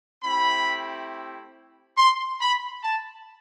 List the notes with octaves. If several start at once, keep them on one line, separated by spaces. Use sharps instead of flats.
A3 C4 E4 G4 B5
C6
B5
A5